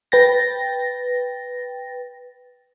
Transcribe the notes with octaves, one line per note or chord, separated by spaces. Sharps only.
B4 G5 A6 A#6